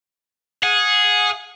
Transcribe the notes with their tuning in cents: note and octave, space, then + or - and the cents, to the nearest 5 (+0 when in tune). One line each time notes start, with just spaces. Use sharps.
G#4 +0 F#5 -30